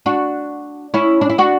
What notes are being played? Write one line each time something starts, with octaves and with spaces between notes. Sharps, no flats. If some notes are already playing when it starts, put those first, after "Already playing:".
D4 F#4
C#4 E4
D4
E4
D4 F#4